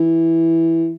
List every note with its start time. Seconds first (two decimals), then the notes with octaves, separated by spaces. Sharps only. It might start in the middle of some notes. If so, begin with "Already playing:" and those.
Already playing: E3